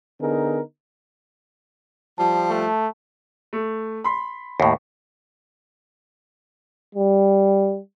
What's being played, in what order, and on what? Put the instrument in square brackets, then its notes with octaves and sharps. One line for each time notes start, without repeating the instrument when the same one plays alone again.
[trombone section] D3 B3 D#4 G#4 A#4
[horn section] F3 G3 [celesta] A5
[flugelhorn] A3
[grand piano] A3
B5 C6
[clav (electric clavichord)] D#2 A2
[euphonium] G3